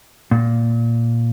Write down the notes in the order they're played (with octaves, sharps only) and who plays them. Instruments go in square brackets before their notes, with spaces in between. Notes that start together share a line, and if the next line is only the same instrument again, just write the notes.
[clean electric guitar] A#2